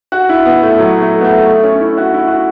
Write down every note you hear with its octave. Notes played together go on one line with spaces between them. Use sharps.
F#4
E4
B3
A3
F#3
A3
B3
A3
A3
C#4
E4
F#4
E4
F#4